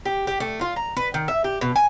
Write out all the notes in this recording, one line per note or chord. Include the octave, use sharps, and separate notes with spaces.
G4
G4
A3
F4
A#5
B4
D#3
E5
G4
B2
G#5